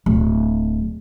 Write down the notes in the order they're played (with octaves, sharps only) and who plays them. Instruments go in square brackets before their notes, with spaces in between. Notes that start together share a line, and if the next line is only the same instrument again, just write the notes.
[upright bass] D1